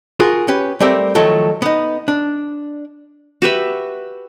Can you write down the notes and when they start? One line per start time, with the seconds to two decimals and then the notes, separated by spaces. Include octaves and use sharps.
0.20 F4 F#4 G#4 A#4
0.48 C#4 G4 B4
0.80 G3 A3 C4 G4 A#4 E5
1.15 D#3 F3 F#3 A3 A4
1.62 B3 D#4
2.08 D4
3.42 F#4 G4 B4 E5